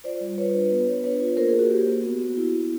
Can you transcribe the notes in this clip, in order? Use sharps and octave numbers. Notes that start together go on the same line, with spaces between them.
F4 C5 D5
G3
F4 B4 C#5
D4
B3
B3
D4 B4 C#5
F4
A#3 A#4 C5
G#4 A#4
A#3
F#4 G#4
A#3 G4
A#3
B3 F#4
B3
E4
B3